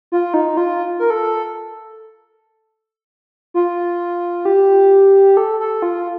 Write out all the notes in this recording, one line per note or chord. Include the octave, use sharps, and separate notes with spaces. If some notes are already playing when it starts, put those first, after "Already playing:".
F4
D#4
F4
A#4
A4
F4
G4
A4
A4
F4